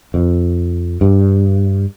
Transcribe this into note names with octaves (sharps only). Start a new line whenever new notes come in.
F2
G2